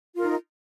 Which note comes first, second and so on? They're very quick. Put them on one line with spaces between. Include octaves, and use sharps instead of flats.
F4 A#4 D#4